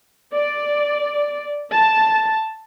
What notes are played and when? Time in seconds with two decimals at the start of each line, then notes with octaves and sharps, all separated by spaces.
0.33 D5
1.73 A5